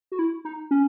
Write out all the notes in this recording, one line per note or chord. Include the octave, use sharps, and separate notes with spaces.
F#4
E4
D#4
C#4